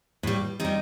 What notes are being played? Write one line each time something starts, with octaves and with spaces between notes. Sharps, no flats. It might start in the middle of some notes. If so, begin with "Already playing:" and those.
A2 G3
C3 G3 D#4